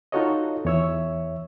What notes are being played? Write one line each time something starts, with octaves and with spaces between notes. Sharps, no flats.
D#4 F4 F#4 A4 C#5 D#5
E2 E3 C#5 E5 E6